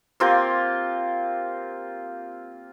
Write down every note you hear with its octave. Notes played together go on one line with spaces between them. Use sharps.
A#3 C4 F4 G4